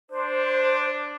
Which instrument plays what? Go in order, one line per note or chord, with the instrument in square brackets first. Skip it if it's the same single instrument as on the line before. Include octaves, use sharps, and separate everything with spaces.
[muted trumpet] D4 [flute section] C5